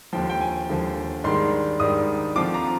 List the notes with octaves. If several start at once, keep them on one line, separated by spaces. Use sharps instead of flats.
D#2 D3 F3 G5
G5
G#5
D#2 D3 F3
G#2 D#3 G3 D4 C6
G#2 D#3 G3 D4 D#6
D3 F3 C4 F4 D6
A#5